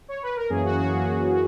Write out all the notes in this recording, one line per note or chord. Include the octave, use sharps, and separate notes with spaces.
C#5
B4
A#4
F#2 E3 A#3 C#4 G#4
F#4
F#4
F#2 E3 A#3 C#4 G#4